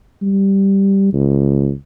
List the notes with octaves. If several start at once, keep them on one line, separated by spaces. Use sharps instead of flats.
G3
C#2